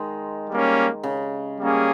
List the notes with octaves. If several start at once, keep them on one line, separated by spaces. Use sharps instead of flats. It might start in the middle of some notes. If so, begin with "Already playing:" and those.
Already playing: D#3 G#3
G3 A#3 C#4
C#3
G3 A#3 C#4 G#4